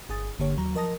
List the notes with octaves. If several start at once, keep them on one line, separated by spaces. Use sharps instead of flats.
G1 G#4 G#5 D#6 A6
G1 D3 A#3 G4 C#5
D#2 F#3 A#5
F3 A#4 D#5 A5 D#6 A#6